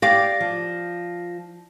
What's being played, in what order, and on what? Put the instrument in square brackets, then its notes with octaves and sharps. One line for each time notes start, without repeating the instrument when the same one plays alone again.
[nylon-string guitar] G4 [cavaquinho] D5 F5 D6 [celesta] A#6
[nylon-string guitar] F3